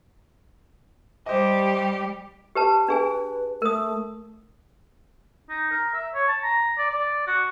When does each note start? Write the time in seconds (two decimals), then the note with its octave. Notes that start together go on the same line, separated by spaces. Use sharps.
1.26 G3 G4 C5 D#5
2.55 G4 B4 A5
2.88 D4 G#4 B4 G#5
3.62 A3 A#4 D#6
5.50 D#4
5.71 A#4
5.94 E5
6.14 C#5
6.28 A5
6.43 A#5
6.78 D5
6.90 D5
7.27 F#4